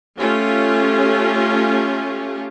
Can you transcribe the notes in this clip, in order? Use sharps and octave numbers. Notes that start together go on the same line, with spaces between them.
A3 C#4 F4 G4